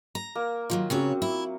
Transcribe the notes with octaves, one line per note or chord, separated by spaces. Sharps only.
A#5
A#3
D#3 F3 F#3 F4
C#3 F#3 C4 F#4 C#5
E4